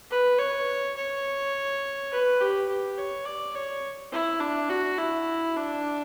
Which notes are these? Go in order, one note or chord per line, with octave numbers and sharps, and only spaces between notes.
B4
C#5
C#5
B4
G4
G4
C#5
D5
C#5
E4
D4
F#4
E4
D4